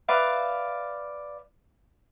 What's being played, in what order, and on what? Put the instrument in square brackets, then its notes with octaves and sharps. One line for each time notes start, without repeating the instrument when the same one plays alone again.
[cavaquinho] B4 D5 E5 F5